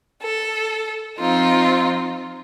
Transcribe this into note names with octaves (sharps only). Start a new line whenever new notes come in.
A4
F3 C4 D#4 F4